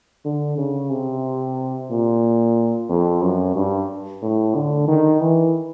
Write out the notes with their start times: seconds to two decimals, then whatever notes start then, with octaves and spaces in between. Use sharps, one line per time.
0.25 D3
0.58 C#3
0.91 C3
1.91 A#2
2.89 F2
3.22 F#2
3.56 G2
4.22 A2
4.55 D3
4.88 D#3
5.21 E3